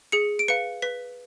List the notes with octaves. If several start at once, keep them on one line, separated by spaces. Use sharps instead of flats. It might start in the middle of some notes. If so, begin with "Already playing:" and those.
G#4 C#7
D7
B4 F5 C#7
B4 B6